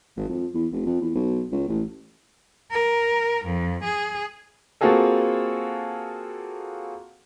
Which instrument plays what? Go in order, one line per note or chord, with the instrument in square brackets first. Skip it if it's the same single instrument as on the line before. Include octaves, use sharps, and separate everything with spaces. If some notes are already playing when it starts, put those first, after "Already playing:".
[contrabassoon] G#1
F2
E2
F1
F2
E2
B1
C#2
A1
[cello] A#4
F2
G#4
[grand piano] A#3 C4 F4 F#4 G#4 A4